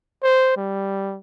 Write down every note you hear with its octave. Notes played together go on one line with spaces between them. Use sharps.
C5
G3